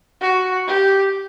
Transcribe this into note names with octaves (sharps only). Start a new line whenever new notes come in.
F#4
G4